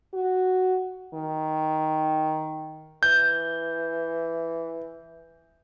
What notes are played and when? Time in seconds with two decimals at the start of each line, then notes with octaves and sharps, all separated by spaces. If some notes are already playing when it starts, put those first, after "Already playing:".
0.13 F#4
1.14 D#3
3.03 E3 G6